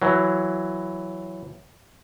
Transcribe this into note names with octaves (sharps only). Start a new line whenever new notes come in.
E3 F#3